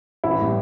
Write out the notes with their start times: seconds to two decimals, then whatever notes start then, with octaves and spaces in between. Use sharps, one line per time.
0.24 A1 E4
0.39 A2 G3